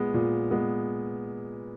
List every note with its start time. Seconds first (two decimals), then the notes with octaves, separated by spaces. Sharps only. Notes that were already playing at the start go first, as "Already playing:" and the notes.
Already playing: A#2 G#3 B3
0.14 A#2
0.51 G#3 B3